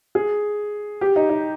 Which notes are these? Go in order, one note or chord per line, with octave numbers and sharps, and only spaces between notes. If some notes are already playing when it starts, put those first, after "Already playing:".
G#4
G4
D#4
D#4